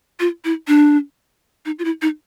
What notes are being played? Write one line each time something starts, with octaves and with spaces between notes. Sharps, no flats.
F4
E4
D4
D#4
F4
E4
D#4